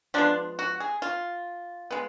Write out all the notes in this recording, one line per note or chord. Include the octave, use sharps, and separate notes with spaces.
F3 G#3 B3 D4
F#4
G#4
F4
G#3 B3